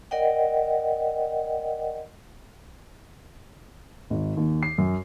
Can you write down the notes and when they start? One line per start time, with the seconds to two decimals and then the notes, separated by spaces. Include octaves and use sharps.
0.11 A#4 D5 D#5 F#5 G5
4.10 G#1
4.37 D#2
4.63 C7
4.78 F#2